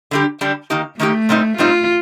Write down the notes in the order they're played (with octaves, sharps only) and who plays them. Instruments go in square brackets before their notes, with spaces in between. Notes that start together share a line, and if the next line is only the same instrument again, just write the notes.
[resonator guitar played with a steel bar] D3 G3 D4 G4
D3 G3 D4 G4
D#3 A#3 D#4 G4
[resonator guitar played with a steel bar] D#3 A#3 D#4 G4 [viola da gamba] A3
[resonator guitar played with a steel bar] A#2 G3 C4 D#4
[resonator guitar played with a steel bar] A#2 G3 C4 D#4 [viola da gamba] F4